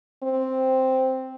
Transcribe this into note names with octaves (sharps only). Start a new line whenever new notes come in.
C4